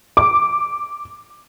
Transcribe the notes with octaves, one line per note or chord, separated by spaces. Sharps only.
D6